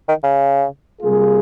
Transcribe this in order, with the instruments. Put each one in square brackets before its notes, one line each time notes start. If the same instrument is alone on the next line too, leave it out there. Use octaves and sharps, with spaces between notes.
[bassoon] D#3
C#3
[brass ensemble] C3 G3 A#3 F4 G#4